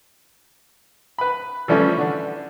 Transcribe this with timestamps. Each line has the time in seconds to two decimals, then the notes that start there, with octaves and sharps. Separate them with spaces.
1.18 B4 B5
1.68 E3 F3 G3 A3 C#4
1.97 D3 D4